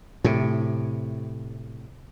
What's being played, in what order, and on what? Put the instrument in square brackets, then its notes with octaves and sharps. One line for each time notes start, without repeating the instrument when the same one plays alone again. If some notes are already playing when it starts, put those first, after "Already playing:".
[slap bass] A2 C3